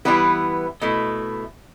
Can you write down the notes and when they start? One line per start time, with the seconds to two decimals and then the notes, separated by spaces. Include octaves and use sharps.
0.05 E3 G3 B3 E4 B4
0.82 B2 A3 E4